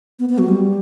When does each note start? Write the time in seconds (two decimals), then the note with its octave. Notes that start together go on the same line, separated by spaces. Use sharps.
0.19 B3
0.29 B3
0.38 F#3
0.48 G3